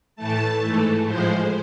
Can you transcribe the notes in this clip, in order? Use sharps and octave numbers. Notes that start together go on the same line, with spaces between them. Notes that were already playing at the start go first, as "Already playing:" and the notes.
A2 E3 A3 A5
G#2 E3 A3
A2 F3 G#3 C5